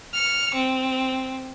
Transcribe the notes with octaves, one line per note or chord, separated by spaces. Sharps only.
F6 C#7
C4